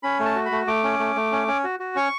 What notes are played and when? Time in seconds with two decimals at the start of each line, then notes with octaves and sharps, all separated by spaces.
0.03 C#4 B5
0.19 A3
0.25 A5
0.36 F#4
0.45 B5
0.52 A3
0.67 A3 D6
0.84 C#4
0.99 A3
1.16 A3
1.32 C#4
1.48 C#4
1.64 F#4
1.80 F#4
1.95 C#4 C#6